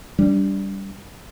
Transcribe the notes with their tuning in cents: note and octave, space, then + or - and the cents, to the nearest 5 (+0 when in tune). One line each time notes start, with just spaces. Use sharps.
G3 +0 D4 -30